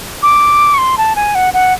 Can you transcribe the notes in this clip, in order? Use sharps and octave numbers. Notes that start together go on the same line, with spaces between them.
D6
C#6
C6
A5
G#5
F#5
F#5